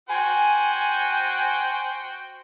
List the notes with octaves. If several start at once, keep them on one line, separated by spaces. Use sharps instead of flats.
F#4 C5 G5 G#5